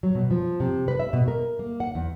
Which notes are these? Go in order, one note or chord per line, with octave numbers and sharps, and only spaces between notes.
F#3
B2
F3
C3
B4
E5
B2
A#4
A#3
F#5
E2